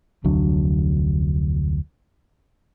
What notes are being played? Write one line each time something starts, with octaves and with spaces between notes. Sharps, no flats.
F1 D2 F#3 D4